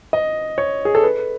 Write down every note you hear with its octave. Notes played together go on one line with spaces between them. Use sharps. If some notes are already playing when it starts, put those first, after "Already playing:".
D#5
C#5
G#4
A4
B4